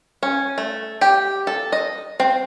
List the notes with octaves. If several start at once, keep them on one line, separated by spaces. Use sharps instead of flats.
C#4
A3
G4
A4
D#5
C4